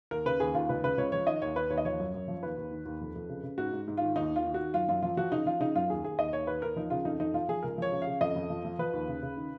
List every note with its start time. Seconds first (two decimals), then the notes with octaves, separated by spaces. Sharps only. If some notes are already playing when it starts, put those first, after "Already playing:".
0.11 D#2 A#4
0.26 C#3 B4
0.40 D#2 G#4
0.55 D#2 F4
0.69 C#2 B4
0.84 C#3 B4
0.98 C#2 C#5
1.12 F3 C#5
1.27 D#3 D#5
1.42 D#2 C#5
1.56 D#3 B4
1.70 D#2 C#5
1.78 D#5
1.85 F3 C#5
1.99 F#2
2.14 F#2
2.28 F3
2.43 D#2 B4
2.57 D#2
2.71 D#3
2.86 D#2
3.01 F2
3.16 F2
3.29 C#3
3.43 C#3
3.58 G#2 F#4
3.73 G#2
3.88 G#2
3.97 D#3 F4
4.16 D#2 D#4
4.31 D#3 F4
4.45 D#3
4.54 F#4
4.60 D#3
4.74 F#2 F4
4.89 F#2 F4
5.02 F3 F4
5.17 F3 F#4
5.32 C#3 D#4
5.46 F3 F4
5.60 C#3 D#4
5.75 F#2 F4
5.90 D#2 G#4
6.04 D#2 G#4
6.18 D#2 D#5
6.33 D#2 C#5
6.47 D#2 B4
6.62 D#2 A#4
6.76 F3 D#4
6.90 C#3 F4
7.05 F2 D#4
7.20 F2 D#4
7.34 F3 F4
7.49 F3 G#4
7.63 C#2 A#4
7.78 F3 C#5
7.92 C#3
8.02 F5
8.07 C#3
8.21 F2 D#5
8.36 F2
8.50 F3
8.64 F3
8.79 F3 B4
8.93 D#2
9.08 C#3
9.22 C#3
9.37 D#3